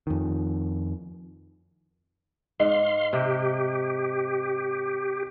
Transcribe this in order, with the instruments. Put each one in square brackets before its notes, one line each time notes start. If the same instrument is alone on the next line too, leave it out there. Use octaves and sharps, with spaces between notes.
[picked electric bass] F2 D#3
[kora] G#2 [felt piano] D#5 [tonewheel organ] F5 C6
[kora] C3 [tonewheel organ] G4